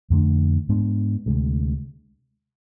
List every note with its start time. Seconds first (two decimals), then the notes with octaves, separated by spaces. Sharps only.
0.10 F2 D3 A3 D4
0.69 G#2 G#3 B3 D4
1.26 D2 C3 G#3